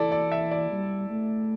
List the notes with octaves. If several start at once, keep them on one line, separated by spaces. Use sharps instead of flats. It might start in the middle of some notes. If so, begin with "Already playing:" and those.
Already playing: E3 E4 A4 D5
D5
E5
D5
G3
A3